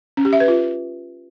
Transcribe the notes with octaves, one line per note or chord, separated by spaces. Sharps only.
C#4
G4
E5
B4
F4